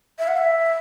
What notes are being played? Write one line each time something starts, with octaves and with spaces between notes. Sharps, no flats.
E5
F#5
E5